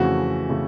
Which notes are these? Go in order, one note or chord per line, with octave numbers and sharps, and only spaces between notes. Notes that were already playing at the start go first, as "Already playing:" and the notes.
Already playing: F2 C#3 E3 A3 F#4
C#3 E3 A3